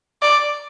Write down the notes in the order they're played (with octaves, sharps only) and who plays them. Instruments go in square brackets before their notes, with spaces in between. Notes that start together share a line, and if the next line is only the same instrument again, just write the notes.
[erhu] D5